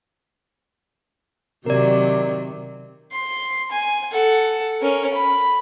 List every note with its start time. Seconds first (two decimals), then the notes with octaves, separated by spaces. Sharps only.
1.66 C3 D#3 F#3 A#4 D5
3.12 C6
3.71 G#5
4.11 A4 F#5
4.81 C#4 A#4
5.13 B5